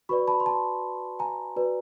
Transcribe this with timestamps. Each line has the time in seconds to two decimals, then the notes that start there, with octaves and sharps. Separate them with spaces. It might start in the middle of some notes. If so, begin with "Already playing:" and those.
0.09 F#4 B4 D5 B5 C#6
0.28 A5 B5
0.40 C6
0.46 A5 B5
1.19 G#5 A#5
1.56 F#4 B4 D5